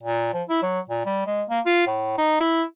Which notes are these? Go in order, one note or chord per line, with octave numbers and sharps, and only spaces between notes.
A#2
F3
E4
F#3
A#2
G3
G#3
A#3
F4
A2
D#4
E4